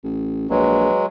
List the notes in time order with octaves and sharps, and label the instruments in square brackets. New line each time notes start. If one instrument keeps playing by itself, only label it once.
[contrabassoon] A1
[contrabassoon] A#1 [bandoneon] F#3 G#3 [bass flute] B4